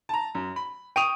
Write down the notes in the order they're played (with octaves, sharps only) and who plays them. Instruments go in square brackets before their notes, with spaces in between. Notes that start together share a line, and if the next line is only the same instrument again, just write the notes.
[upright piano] A5 A#5
F#2
B5
[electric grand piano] G5 C#6 D#6 [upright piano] D7 D#7 F7